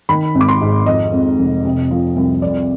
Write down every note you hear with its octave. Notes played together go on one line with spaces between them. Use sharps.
D#3 B5
G#1
D6
C6
G#2
F2 D#5
F2
F1
C3
F3
C2
F2 D5